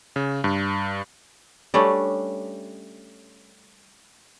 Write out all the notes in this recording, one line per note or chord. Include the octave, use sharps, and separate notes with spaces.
C#3
G2
G3 A3 C#4 D4